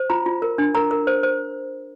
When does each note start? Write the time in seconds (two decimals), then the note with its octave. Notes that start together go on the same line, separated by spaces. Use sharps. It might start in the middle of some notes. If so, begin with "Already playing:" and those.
Already playing: C5
0.10 F4 A#5
0.26 F4
0.42 A#4
0.58 D4
0.75 A#4 A#5
0.91 A#4
1.07 C5
1.23 C5